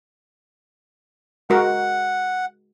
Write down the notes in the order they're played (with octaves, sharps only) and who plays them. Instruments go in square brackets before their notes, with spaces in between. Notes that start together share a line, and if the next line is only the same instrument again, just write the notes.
[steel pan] G#3 F#4 A#4 [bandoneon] F#5